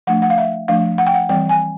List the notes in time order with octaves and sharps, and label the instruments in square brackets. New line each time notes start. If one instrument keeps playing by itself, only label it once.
[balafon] F3 A3 D4 F#5
F#5
F5
E5
F3 A3 D4 F5
F#5
G5
F#5
E3 G3 C4 G5
G#5